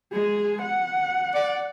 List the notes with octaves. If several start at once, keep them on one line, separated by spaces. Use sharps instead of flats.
G#3 G#4
F#5
D5